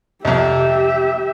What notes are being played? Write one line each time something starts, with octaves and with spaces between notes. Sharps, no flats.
C2 F2 G4 E5